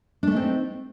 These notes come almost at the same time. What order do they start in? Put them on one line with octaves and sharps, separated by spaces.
D4 A3 D#4 C4